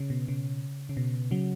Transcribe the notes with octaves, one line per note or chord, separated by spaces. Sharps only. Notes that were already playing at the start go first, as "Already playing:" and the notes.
Already playing: C#3
B2
C#3
C#3
B2
C#3 F#3